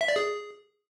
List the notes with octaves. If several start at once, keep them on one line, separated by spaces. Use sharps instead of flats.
E5
D5
G#4